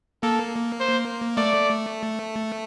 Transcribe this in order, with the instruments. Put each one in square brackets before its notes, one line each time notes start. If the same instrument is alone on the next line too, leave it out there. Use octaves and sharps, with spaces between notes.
[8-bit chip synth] A#3 [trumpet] A4
[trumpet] C5
[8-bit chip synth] A3 [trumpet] D5